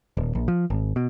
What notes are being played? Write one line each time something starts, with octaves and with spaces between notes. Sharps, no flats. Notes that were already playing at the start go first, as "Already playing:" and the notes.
D#1
A#1
F3
G#1
B2